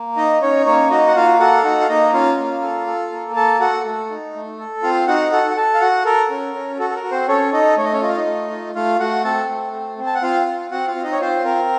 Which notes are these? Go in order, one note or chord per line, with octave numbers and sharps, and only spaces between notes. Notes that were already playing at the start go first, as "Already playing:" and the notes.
Already playing: A#3
D#4 D#5
C#4 D#4 C#5
A#3 C#4 C#5
D#4 F#4 D#5
F#5
A#3 F4 F5
F#4 A4 F#5
F5
D#4 F#4 F#5
F5
A#3 D#4 D#5
C#4 F4 F5
A#3
A4
A4
A#3
A4 A5
F#4 A4 F#5
A3
D#4
A3
A4
C4 F4 F5
D#4 F#4 F#5
F#4 A4 F#5
F#5
A4 A5
F5
F#4 F#5
A4 A#4
C#4
C#4
F#4 A4
A4
A#4
F#4
C4 C5
C#4 A4 C#5
D#4 A4 D#5
A3 C#5
D#5
C#4 C#5
F4 D#5
F5
D#4 D#5
A3
F4
A3 F4 F5
A3 F#4 F#5
C4 A4 A5
A3
C4
C4
A5
F#5
C4 F4 F5
C4
C4 F#4 F#5
F4 F5
C4
D#4 D#5
C#5
C4 F4 C5
C4 A#4